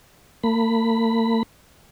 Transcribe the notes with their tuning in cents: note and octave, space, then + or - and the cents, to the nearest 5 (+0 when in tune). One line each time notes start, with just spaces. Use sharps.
A#3 -45 B5 +0